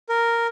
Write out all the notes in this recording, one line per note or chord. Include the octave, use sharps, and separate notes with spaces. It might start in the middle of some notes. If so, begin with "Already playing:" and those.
A#4